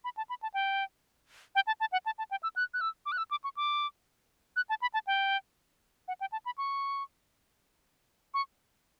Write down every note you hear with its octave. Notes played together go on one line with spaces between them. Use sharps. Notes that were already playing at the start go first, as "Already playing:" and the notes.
B5
A5
B5
A5
G5
G5
A5
A5
F#5
A5
A5
G5
E6
F#6
F#6
E6
D6
F#6
E6
D6
C#6
D6
F#6
A5
B5
A5
G5
F#5
G5
A5
B5
C#6
C#6